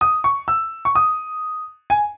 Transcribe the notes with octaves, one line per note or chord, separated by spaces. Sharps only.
D#6
C#6
E6
C#6
D#6
G#5